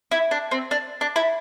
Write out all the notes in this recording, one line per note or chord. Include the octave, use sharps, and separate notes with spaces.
E4
D4
C4
D4
D4
E4